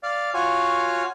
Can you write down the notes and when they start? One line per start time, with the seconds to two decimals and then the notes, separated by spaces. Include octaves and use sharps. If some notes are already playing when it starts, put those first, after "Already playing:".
0.03 D5 F5
0.34 F4 F#4 C#5 F5 G#5